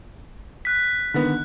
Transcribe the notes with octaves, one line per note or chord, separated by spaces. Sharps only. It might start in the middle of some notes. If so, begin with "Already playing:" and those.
F#6 B6
D3 D#3 B3